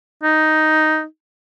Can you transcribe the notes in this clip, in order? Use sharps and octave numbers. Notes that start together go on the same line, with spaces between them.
D#4